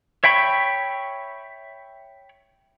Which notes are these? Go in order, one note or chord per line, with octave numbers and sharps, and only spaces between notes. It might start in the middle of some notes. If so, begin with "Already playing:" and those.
C#5 E5 G5 B5 C#6